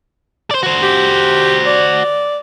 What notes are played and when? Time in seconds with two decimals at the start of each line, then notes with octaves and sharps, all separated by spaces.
0.51 C5 D5
0.63 F#4 C5
0.82 G4
1.66 D5